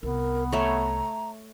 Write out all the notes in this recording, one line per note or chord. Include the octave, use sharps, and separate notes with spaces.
C2 B3 A#4
A3 C#5 A#5